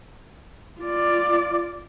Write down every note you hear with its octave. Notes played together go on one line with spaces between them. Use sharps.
F4 D5